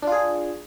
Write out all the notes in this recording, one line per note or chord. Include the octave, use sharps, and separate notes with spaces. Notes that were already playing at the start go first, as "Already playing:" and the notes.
D4 F4 G#4